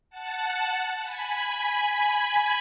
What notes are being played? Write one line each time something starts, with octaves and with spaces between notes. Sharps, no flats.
F#5 A5
G#5 B5
G#5 B5